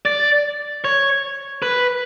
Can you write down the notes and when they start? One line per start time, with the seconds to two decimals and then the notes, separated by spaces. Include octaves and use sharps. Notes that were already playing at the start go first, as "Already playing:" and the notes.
0.05 D5
0.85 C#5
1.62 B4